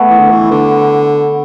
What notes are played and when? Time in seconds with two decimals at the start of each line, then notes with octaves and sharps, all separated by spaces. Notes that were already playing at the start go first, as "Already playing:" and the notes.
Already playing: A3 B3
0.10 E3
0.20 D3
0.30 E3
0.51 D3